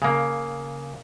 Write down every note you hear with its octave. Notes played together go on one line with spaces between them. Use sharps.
C#3 A#3